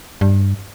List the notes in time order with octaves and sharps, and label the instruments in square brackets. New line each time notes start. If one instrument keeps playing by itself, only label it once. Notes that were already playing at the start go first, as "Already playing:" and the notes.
[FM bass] G2